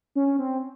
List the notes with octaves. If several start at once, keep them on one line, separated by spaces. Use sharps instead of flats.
C#4
C4